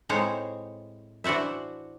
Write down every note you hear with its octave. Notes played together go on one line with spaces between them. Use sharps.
A2 G#3 C4 D#4 C5 C#5
E3 D4 F#4 C5 E5